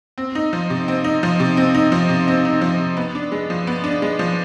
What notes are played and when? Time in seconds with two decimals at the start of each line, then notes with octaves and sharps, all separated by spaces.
0.18 C4
0.35 D#4
0.53 F3
0.70 C3
0.88 C4
1.04 D#4
1.23 F3
1.40 C3
1.57 C4
1.75 D#4
1.92 F3
2.09 C3
2.28 C4
2.45 D#4
2.61 F3
2.80 C3
2.97 B3
3.15 D4
3.32 G#3
3.50 F3
3.67 B3
3.84 D4
4.02 G#3
4.19 F3